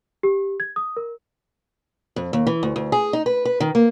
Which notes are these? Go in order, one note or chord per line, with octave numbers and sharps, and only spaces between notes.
G4
G#6
D#6
A#4
F2
D#2
E3
D2
D2
G#4
D#4
B4
B4
D#3
A#3